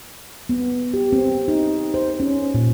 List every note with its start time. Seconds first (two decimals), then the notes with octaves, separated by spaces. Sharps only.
0.49 B3
0.94 G4
1.13 C4
1.48 D#4
1.94 C5
2.20 C#4
2.54 A#2